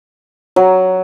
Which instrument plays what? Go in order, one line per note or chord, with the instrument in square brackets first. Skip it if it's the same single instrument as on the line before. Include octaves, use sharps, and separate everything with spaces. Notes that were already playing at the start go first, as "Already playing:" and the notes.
[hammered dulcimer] F#3